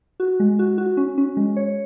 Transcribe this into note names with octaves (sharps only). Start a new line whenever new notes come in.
F#4
G#3
F#4
F#4
C#4
C#4
G#3
C#5